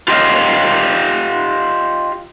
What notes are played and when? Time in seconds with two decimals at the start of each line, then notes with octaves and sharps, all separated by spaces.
0.08 F4 G4 A4 D5 D#5 F5